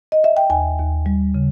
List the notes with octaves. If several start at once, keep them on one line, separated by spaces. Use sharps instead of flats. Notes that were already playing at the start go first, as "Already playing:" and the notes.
D#5
E5
G5
D#2 G#5
D#2
G3
C#3